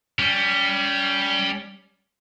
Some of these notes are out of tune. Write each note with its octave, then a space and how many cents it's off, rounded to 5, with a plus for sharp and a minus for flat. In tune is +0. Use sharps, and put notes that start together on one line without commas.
G3 +0 C#4 +25